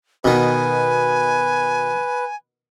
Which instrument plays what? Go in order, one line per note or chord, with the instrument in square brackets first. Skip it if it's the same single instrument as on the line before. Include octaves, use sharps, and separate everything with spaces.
[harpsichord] B2 D#3 [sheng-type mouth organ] B4 [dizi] G#5